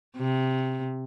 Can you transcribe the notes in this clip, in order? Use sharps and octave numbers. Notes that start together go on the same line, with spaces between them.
C3